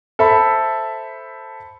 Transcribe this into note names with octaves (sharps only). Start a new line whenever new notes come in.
A4 C5 E5 B5